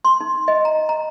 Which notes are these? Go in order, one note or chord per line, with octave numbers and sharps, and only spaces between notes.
C6
D#4
D#5
A#5
A#5